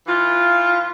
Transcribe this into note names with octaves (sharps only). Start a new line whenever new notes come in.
E3 F4